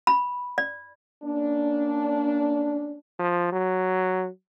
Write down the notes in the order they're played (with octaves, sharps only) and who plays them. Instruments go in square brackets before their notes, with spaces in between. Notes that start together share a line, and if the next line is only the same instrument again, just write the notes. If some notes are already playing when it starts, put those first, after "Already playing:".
[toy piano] B5
D5
[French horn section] A#3 C#4 D4
[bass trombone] F3
F#3